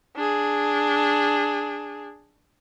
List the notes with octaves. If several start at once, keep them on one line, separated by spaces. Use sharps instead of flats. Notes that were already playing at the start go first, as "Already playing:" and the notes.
D4 G#4